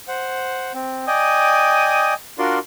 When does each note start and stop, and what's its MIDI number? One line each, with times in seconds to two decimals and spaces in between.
0.08 0.72 72
0.08 0.72 78
0.74 1.05 60
1.07 2.14 74
1.07 2.14 75
1.07 2.14 79
1.07 2.14 80
1.07 2.14 87
2.39 2.59 62
2.39 2.59 65
2.39 2.59 66
2.39 2.59 70
2.39 2.59 74
2.39 2.59 84